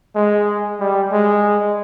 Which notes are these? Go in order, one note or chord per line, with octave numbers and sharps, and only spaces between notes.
G#3
G3
G#3